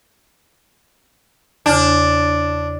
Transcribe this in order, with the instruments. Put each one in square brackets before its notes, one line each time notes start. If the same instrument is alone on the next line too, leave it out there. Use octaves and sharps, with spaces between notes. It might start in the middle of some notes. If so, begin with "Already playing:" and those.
[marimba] E2 C#3 [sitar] D4